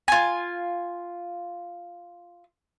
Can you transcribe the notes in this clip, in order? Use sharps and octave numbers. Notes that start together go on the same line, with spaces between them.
F4 G#5